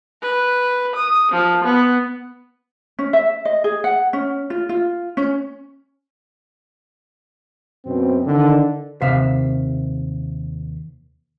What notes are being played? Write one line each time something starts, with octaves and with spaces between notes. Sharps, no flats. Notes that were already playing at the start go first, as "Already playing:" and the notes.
B4
D#6
F3
B3
C#4
E5
D#5
G#4
F#5
C#4
F4
F4
C#4
F#2 B2 C4
D3 D#3
D#2 C3 E5 F5